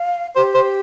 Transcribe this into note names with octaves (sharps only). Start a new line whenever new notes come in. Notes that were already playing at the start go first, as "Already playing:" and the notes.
Already playing: F5
G4 C5
C5